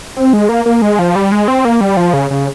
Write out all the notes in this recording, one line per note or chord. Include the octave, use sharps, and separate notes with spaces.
C4
G#3
A#3
A#3
G#3
F3
G3
G#3
C4
A#3
G3
F3
C#3
C#3